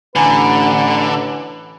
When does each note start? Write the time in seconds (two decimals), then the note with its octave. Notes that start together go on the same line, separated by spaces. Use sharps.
0.16 A1 D3 B4 G#5 A#5